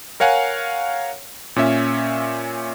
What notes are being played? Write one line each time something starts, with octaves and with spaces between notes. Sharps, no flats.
A#4 C#5 F5 F#5 G#5
A#2 C#4 E5